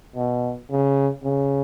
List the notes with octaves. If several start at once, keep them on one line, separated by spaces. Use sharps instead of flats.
B2
C#3
C#3